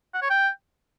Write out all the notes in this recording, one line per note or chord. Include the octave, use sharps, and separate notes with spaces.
F#5
C#5
G5